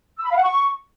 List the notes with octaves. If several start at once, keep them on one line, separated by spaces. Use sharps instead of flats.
E6
B5
F5
F#5
C#6